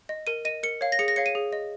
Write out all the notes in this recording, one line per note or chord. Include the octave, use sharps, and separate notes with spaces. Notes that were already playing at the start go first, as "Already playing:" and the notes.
D#5
A#4 D#7
D#5 D#7
A#4 C#7
C#5 F5
A#6
G#4 C#7
A#6
C#5 F5 C#7
D#7
G#4
D#5